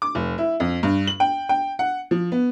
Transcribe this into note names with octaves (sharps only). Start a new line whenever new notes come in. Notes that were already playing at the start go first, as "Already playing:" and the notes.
D6
F1
E4
F2
G2
F#7
G5
G5
F#5
F3
B3